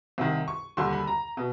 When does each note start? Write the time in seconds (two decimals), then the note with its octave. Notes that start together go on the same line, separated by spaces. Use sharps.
0.18 C2 C3 D#3
0.48 C#6
0.77 D#2 D3 G3 C6
0.93 B5
1.07 A#5
1.37 B2